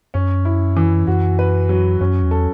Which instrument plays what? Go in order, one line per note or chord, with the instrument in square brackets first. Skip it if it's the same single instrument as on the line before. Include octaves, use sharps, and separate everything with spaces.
[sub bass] F#2 [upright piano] C#4
[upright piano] E4
E3
[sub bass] F#2 [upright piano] F#4
[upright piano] B4
F#3
[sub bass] F#2 [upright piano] C#4
[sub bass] E2
[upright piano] A4